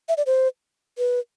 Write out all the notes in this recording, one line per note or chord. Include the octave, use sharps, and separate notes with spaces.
E5
D5
C5
B4